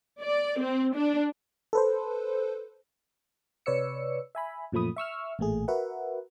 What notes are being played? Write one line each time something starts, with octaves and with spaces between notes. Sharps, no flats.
D5
C4
D4
A4 B4 C5
C3 B4 C#5 D5 E6 C#7
E5 G#5 B5
F#2 A#2 F3 A3 B5 D#6
E5 C#6 E6 F6
A1 A#2 A3 G#4
F#4 A#4 B4 E5 F#5